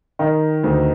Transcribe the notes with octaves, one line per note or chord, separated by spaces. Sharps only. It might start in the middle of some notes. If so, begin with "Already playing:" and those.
D#3
D2